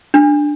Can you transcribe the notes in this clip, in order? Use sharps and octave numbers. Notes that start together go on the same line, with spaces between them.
D4